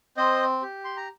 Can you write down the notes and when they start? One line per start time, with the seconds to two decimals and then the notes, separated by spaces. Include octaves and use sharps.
0.17 C4 C5 D#5
0.62 G4
0.85 C6
0.97 A#5